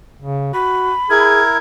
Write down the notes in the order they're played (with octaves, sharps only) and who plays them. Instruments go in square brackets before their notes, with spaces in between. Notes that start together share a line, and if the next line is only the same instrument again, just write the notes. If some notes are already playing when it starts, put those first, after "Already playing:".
[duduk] C#3
[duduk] F#4 [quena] B5
[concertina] E4 A#4 [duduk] G#4 [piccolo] G#6